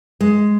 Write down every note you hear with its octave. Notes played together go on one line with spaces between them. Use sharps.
G#3